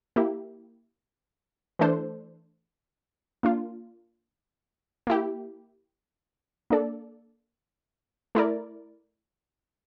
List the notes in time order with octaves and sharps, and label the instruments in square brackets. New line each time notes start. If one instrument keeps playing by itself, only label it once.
[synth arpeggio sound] A#3 E4 G4
E3 A3 D4 A4 C5
A#3 D4 F4
A#3 E4 G4
A#3 D4 A4 D5
A3 E4 A#4 D5